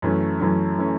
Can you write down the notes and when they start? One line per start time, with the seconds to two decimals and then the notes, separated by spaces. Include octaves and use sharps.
0.02 F#2 E3 A3 C#4
0.40 F#2 E3 A3 C#4
0.78 E3 A3 C#4